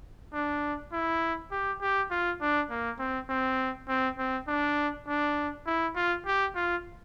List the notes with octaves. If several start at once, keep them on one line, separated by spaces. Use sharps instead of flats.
D4
E4
G4
G4
F4
D4
A#3
C4
C4
C4
C4
D4
D4
E4
F4
G4
F4